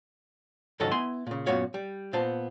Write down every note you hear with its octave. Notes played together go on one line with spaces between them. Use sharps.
C#2 G#2 D#3 F#3 A4 D#5
B3 E4 G#5 C6
A#2 C#3
F#2 A#2 B3 F#4 C#5 F5
G3
A#2 B3 C5 A5